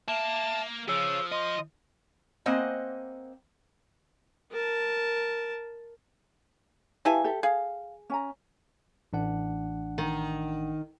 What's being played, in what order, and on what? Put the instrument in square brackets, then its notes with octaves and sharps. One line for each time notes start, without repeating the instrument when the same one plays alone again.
[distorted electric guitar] A#3 [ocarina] E5 [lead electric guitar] A5
[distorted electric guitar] F3 [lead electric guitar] G#4 C#5 [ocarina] E6
[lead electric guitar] D#5 [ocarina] C6
[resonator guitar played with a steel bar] A#3 C4 C5 D#5 F#5 G#5
[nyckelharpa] A#4 A5
[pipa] E3 E4 G#5 [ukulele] G4 F5 A5
[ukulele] G4 A4 E5
[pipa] G#4 [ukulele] F5
[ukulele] C#4 G#5 A#5
[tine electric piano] A1 D4 F#5
[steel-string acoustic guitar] D#3